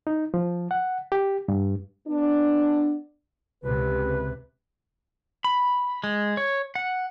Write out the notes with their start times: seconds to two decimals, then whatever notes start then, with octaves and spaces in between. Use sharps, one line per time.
0.07 D#4
0.34 F3
0.71 F#5
1.12 G4
1.48 G2
2.08 B3 D4
3.64 C#2 C3 B4
5.44 B5
6.04 G#3
6.37 C#5
6.75 F#5